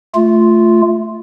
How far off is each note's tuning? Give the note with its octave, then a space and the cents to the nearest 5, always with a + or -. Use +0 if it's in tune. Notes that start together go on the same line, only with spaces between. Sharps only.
A3 +0 F4 +0